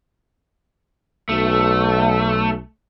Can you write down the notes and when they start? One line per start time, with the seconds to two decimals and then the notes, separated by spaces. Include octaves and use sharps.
1.29 B1 A3